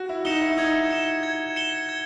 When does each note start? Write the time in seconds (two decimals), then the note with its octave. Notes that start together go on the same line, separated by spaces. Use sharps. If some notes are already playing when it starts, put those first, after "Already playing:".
Already playing: F#4
0.09 E4
0.25 D#4 C#7 E7 G7
0.41 E4
0.58 D#4 G#6
0.91 C#7 E7 G7
1.23 G#6
1.56 C#7 E7 G7
1.89 G#6